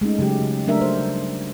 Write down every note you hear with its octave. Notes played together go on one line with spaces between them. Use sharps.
G#3 A3 C#4 D#4
C#3 F#3 G#3 G4
C#3
F#3 G3 A3 D4 A#4 E5
D4 C5
C#3 G3 A3